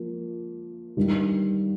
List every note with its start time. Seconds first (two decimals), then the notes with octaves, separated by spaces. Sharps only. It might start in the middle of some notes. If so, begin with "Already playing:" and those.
Already playing: F3 A#3
0.97 G2 D#3 G3